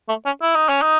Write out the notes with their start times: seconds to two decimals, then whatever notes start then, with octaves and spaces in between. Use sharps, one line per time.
0.09 A3
0.26 C#4
0.42 E4
0.55 D#4
0.69 C#4
0.82 D#4